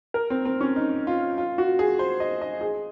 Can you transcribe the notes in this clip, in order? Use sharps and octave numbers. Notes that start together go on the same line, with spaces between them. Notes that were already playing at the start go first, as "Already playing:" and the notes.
A#4
C4
C4
C#4
D#4
F4
F4
F#4
G#4
C5
D#5
D#5
G#4